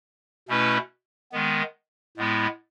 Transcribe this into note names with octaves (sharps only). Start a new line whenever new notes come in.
B2 A3 C#4 E4 B4
D#3 G#3 B3
A2 G#3 B3 E4